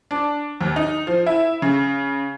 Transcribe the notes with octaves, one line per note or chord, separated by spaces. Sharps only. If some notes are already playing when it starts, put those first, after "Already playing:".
D4
D#2
D#4
F3
E4
C#3